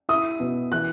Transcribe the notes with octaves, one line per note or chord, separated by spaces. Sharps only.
E4 D#6
B2
E3 F#6